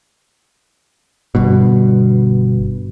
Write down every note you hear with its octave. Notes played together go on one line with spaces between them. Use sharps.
G1 G2 B2